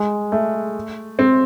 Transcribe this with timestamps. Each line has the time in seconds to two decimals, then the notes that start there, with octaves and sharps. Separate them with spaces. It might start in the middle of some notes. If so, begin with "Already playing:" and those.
Already playing: G#3
0.32 A3
1.19 C4